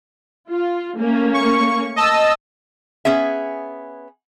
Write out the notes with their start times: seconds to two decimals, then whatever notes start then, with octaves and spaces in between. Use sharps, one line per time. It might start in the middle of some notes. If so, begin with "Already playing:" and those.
0.50 F4
0.96 A3 A#3 C#4
1.34 C#6
1.96 D#5 A5 E6
3.05 B3 C#4 G#4 E5